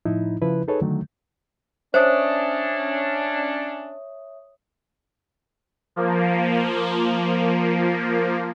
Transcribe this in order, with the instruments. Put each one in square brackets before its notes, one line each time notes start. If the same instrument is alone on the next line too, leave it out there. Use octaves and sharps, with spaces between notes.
[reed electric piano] A2 F3 D#4 E4
C#3 F3 E4 B4
D#4 G#4 A4 B4 C#5
D3 D#3 F#3 A3
[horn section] C#4 D4 [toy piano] C5 [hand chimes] C#5 E5 D#6
[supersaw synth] F3 A#3